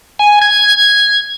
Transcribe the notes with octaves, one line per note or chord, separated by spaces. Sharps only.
G#5
G#6